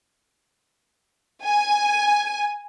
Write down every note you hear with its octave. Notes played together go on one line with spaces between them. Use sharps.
G#5